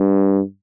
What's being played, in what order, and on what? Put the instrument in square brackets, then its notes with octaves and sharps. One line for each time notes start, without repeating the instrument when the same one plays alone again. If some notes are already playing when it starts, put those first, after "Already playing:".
Already playing: [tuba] G2